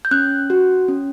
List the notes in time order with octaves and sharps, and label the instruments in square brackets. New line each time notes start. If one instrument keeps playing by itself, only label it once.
[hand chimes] G6
C#4 F#6
F#4
C#4